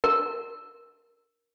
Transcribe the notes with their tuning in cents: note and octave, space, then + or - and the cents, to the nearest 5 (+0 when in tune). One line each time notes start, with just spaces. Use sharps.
A#4 +10